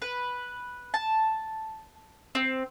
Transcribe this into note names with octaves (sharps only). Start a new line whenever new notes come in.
B4
A5
C4